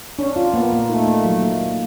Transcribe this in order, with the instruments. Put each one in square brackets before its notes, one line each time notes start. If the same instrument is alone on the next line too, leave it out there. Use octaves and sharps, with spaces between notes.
[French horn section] C#4 [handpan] D4
[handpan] F4
[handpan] A#3 [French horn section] B3
[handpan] A#3
[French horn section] A3 [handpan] D#4
[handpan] A#3
F#3
A#3
A3